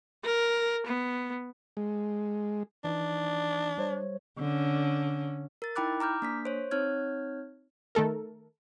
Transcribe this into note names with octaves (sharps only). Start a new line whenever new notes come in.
A#4
B3
G#3
E3 D4 D#4
G3 C5 C#5
D3 C#4
A#4 A6
D#4 E4 G5 B5 D6 F#6
A#5 D6 F6 G6
A#3 D4 B6
C5 C#5
C4 D#4 C#5 F6 G#6
D#3 A3 A4 A#4